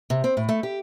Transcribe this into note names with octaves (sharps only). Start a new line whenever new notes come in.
C3
C4
A2
A3
G4